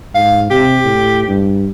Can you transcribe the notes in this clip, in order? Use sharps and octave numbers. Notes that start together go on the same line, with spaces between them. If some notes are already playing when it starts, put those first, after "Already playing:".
G#2 F5
C3 G4
A2
G2